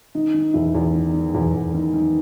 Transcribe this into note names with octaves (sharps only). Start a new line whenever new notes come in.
D#3 D#4
D#3
E2 E4
E2
D#3
D#3
E2
E2
D#3
D#3